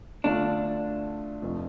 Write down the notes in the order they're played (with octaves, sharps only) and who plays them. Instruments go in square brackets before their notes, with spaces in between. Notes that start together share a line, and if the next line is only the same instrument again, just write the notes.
[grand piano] D2 D3 A3 F4 [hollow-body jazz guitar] D4
[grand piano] F1 F2 F3 A3 C4